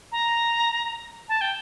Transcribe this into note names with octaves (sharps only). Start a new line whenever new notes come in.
A#5
A5
G5